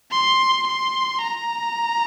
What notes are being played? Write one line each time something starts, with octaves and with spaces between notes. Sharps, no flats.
C6
C6
A#5